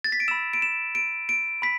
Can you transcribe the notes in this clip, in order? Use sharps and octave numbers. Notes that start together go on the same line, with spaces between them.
A6
B6
D7
B5 E6 E7
D7
E7
D7
D7
B5 B6